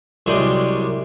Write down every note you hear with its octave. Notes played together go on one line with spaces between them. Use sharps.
C2 F#3 G#3 G#4 D5 G5